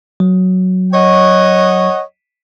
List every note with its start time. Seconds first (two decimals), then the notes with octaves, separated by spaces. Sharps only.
0.20 F#3
0.93 C#5 D#5 F#5